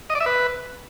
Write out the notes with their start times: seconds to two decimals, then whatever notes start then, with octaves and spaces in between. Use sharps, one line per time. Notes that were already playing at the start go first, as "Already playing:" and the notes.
0.10 D#5
0.15 D5
0.21 E5
0.26 B4